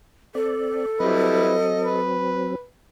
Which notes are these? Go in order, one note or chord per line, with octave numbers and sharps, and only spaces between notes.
C4 A4 D5
F#3 G3 C4 E4 B4 D#5
B4